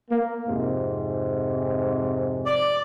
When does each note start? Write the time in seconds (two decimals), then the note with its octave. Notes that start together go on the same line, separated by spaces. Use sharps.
0.10 A#3
0.48 F2 G#2 C3
2.46 D5